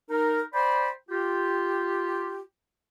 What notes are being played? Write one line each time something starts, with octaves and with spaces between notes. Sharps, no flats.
D#4 A#4
C5 D5 G5 B5
F4 G4